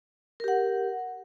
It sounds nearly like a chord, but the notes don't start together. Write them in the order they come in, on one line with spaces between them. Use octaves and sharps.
A#4 G4 F#5